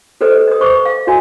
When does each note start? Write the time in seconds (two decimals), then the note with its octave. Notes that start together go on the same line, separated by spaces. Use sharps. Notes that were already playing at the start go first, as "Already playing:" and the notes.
0.21 G4 A4 B4 C5 D#5
0.48 D#5 D#6
0.61 C5 C#6 D6
0.85 F5
1.07 F#4 D#5 G#5